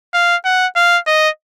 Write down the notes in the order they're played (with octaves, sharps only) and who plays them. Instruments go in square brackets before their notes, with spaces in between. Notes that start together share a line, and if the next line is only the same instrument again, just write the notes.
[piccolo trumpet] F5
F#5
F5
D#5